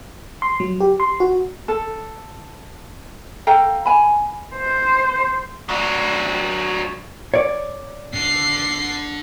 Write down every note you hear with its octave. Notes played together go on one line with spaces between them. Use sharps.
C6
F#3
G4
C6
F#4
A4
A4 F5 G5 A#5
G#5 B5
C5
F#3 D4
C#5 D5
D3 C7